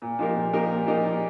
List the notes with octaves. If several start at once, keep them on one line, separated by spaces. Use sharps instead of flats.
A#2
F3 D#4 G4 A#4
A#2
F3 D#4 G4 A#4
A#2
F3 D#4 G4 A#4
A#2